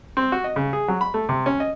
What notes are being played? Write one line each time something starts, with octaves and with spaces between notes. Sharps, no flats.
C4
F#4
D#5
C#3
G#4
F#3
B5
A3
C3
C#4
D#5